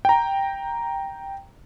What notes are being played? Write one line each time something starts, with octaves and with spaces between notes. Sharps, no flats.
G5 A#5